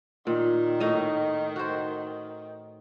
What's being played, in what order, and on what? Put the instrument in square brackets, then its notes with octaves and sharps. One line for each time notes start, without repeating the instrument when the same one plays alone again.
[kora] A#2 [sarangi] D#3
[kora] A2 D#4 D#5
F#4 C5